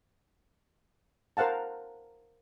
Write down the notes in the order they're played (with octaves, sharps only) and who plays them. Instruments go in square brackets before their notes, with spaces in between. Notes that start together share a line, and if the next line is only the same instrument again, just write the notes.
[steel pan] A#4 C5 F5 F#5 A5